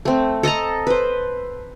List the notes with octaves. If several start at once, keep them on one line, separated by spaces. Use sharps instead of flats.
A3 C4
A4 D#5 A5 A#5
B4 C5